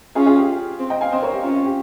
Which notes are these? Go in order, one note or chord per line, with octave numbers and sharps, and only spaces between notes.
C#4 F4 G#4
F4 G#4
G4
C4
D#5 G5
F5 G#5
C4 C5 D#5
A#4 C#5
G4
C#4 F4
F4
G4